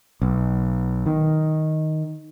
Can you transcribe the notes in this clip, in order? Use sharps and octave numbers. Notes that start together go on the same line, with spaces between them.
B1
D#3